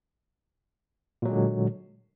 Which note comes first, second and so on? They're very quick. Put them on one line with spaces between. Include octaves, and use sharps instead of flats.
A#2 F#3 G#3 D3